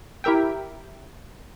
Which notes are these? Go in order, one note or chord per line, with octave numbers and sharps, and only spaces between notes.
E4 G4 A#4 E5 G5